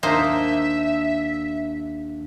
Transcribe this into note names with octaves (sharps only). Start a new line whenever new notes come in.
D#2 A#3 D4 D#4 C5 E5 A5